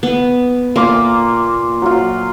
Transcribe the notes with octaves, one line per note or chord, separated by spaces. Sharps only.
B3
A#2 A#3 F4 D6
F#3 F4